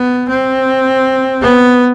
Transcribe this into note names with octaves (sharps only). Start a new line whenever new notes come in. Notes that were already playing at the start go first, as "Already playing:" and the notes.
Already playing: B3
C4
B3